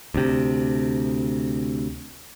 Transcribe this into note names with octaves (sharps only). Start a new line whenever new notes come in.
D2 C3